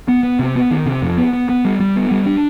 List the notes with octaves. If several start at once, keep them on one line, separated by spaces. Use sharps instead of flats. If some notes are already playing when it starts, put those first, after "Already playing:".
B3
B3
C3
B3
D#3
C3
F2
B3
B3
B3
G3
G3
B3
G3
D4